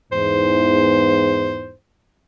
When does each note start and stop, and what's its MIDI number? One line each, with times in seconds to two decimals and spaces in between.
0.12 1.74 40
0.12 1.74 44
0.12 1.74 72